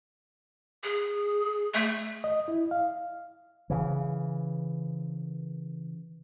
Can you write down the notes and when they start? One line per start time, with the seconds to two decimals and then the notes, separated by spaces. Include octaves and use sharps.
0.83 G#4
1.74 A3
2.24 D#5
2.48 E4
2.71 F5
3.70 C#3 E3